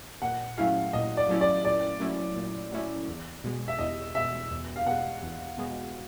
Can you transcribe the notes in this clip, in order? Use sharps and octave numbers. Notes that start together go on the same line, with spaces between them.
A#2 F#5
F#3 A3 C#4 E4 F5
A#2 D#5
D5
F#3 A3 C#4 E4
D5
A#2 D5
F#3 A3 C#4 E4
A#2
F#3 A3 C#4 E4
E2
B2 G#3
E5
E2 D#5
B2 G#3 E5
E2
F5
B2 G#3 F#5
E2
B2 G#3